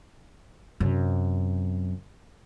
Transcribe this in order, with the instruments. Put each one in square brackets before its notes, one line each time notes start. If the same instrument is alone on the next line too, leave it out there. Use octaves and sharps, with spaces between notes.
[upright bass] F#2 C3